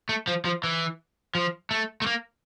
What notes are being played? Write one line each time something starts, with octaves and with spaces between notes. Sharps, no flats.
A3
F3
F3
E3
F3
A3
A3
A#3